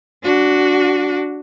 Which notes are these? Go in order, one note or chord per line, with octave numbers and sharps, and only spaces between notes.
D4 F#4